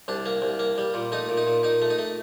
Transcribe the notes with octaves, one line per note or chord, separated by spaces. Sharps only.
C2 D4
A#3
C2
A#3
G3
A#2
A3 D#4
A#2
D#4
A#2
A#2 D#4
A3
D#4
A3